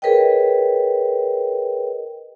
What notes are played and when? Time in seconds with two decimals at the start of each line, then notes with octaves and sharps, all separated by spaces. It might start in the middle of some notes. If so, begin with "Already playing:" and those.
0.02 G#4 A#4 B4 C#5 D#5 G5